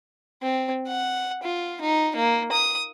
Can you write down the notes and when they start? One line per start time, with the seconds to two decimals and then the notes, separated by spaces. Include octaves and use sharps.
0.43 C4
0.87 F#5
1.43 F4
1.81 D#4
2.16 A#3
2.52 D#6